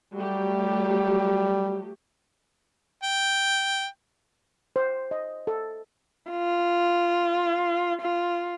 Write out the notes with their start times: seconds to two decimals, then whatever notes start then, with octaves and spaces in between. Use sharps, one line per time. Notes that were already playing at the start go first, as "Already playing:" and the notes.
0.14 F#3 G3 A3 G4
3.03 G5
4.76 C5
5.11 D#5
5.47 A4
6.30 F4
8.01 F4